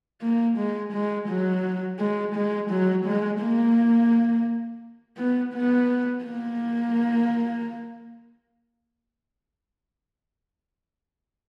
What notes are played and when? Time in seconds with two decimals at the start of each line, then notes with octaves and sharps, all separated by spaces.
0.22 A#3
0.58 G#3
0.93 G#3
1.29 F#3
1.99 G#3
2.35 G#3
2.70 F#3
3.06 G#3
3.41 A#3
5.17 B3
5.54 B3
6.24 A#3